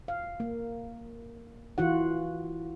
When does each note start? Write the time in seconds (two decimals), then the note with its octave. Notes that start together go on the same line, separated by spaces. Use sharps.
0.08 F5
0.40 A#3
1.78 E3 F4 F#4 F#5